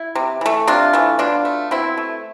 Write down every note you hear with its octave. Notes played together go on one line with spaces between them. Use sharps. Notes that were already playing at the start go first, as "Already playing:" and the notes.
Already playing: E4
C3
E3 A3
C3 D4 F4
E3 A3
B2 D4 F4
A3
B2 C4 E4
A3